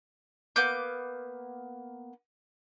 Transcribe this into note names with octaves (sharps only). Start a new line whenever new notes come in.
A#3 B3 D6 G6